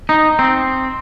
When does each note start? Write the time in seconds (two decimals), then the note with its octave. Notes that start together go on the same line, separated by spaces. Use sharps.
0.09 D#4
0.39 C4